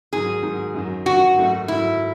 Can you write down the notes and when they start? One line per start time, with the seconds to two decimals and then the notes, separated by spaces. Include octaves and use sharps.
0.13 G#2 D#3 F#3 G#4
0.43 G#2 D#3 F#3
0.74 F#2 D#3 F#3
1.06 F#2 D#3 F#3 F#4
1.38 G#2 D#3 F#3 A3
1.68 G#2 D#3 F#3 A3 E4